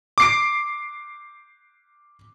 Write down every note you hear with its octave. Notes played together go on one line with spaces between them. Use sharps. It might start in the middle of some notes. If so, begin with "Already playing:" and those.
D6 C7 D7